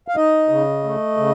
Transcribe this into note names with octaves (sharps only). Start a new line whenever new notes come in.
F5
D#4 D#5
C#3
A3
C#3